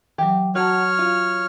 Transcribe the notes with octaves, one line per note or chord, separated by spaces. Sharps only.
E3 F#3 G4
F#3 F#4 C#5 A5 F6
F4